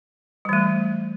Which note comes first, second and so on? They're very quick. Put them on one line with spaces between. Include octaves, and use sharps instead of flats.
G3 E3 A3